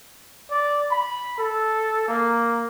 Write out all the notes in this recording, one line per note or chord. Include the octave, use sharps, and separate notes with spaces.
D5
B5
A4
A#3